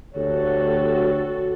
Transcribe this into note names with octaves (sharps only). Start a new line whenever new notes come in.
D2 F#4 G4 A4 C#5